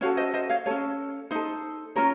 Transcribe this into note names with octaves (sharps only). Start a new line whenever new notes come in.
C#4 F#4 A4 C#5 F5
C5 D#5
C5 D#5
C#5 F5
C#4 A4 C#5
D#4 A4 C5
C#4 F4 A#4 C#5